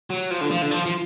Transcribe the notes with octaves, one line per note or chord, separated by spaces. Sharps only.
F#3
F3
D3
F3
D3
F3
F3